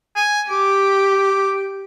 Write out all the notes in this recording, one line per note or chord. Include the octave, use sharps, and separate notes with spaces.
G#5
G4 D6